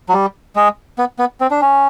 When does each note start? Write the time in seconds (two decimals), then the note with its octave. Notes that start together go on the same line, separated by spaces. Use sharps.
0.09 F#3
0.13 G3
0.56 G#3
0.98 B3
1.19 B3
1.41 C4
1.51 D4
1.62 C#4